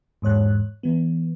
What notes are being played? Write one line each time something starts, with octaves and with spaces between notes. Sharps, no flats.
E2 G#2 C#5 F#6
E3 B3